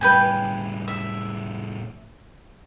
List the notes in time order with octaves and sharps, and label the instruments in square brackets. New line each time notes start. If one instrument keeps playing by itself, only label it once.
[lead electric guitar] A2 G3 [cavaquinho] B4 G5 G#5
[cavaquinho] E5